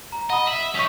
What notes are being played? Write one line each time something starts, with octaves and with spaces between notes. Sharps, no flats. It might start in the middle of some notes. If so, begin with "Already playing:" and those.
A#5
D#5 F#5 B5 D#6
E5 F#7
C#4 D#4 C#6 B6